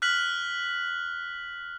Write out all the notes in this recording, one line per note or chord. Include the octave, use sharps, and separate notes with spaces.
F6 F#6 B6 F#7